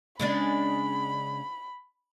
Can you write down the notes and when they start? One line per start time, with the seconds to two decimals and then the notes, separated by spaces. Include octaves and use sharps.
0.20 C#3 G#3 D4 B5